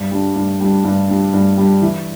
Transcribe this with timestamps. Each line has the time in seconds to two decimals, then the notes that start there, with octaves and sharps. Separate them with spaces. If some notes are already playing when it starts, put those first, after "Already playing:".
Already playing: G2
0.11 G3 D4
0.36 G2
0.60 G3 D4
0.84 G2
1.09 G3 D4
1.34 G2
1.57 G3 D4
1.82 E3